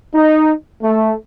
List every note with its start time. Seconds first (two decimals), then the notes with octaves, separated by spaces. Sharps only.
0.15 D#4
0.83 A3